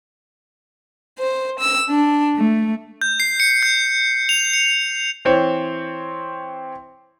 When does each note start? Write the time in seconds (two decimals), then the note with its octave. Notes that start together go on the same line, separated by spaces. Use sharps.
1.20 C5
1.59 E6
1.90 D4
2.37 A3
3.02 G6
3.20 C7
3.40 C#7
3.63 G6
4.29 F7
4.53 C#7
5.25 E3 C4 C5 C#5